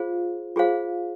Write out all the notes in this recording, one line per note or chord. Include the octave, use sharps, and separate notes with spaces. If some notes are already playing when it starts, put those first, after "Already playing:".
Already playing: F4 G#4 C5 F5
F4 G#4 C5 F5